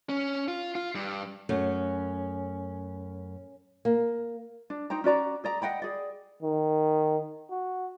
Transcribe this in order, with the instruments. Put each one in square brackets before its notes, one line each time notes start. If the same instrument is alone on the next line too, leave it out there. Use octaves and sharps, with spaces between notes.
[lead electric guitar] C#4
F4
F4
G2
[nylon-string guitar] F#2 A3 [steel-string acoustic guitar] C#4
[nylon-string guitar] A#3
[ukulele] D4
D#4 C5 G5 A#5
C#4 F#4 D5 A#5
G#4 D5 A#5
D#5 F#5 G5 B5
G#4 D5
[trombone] D#3
F#4